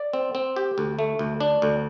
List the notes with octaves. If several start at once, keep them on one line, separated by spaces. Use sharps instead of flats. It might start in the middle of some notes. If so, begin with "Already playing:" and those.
Already playing: D5
C4
C4
G4
D2
A3
D2
D4
D2